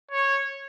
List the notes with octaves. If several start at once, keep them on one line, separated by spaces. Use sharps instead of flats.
C#5